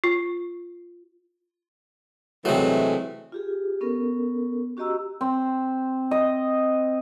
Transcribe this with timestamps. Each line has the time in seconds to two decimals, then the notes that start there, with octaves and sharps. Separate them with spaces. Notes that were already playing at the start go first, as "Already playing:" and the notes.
0.04 F4
2.45 C3 E3 F#3 G#3 A3
3.32 F4 G4 G#4
3.81 B3 C#4 A4 A#4
4.77 C#4 F#4 G4 D#5 A#5 E6
5.21 C4
6.11 D#5